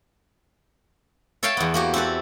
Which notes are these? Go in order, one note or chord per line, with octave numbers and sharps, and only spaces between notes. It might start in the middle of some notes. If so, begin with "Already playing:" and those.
A4 C#5 E5 F5 G5 A5
E2 B3
A#3 F#4 G4
C4 E4 A4 B4